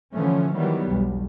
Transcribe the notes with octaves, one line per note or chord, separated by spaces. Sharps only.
D3 E3 F3 A3 C#4
D#3 E3 F#3 G3 B3
B1 E2